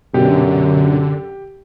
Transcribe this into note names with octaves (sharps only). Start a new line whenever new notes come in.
F#2 B2 D3 G4